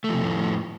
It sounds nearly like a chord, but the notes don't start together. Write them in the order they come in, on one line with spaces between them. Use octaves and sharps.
A3 F3 C3 F2 A2